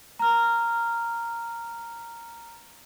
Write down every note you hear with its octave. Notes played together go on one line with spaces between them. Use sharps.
A#5 F6